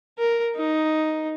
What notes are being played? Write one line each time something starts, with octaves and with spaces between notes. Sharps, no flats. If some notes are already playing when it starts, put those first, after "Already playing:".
A#4
D#4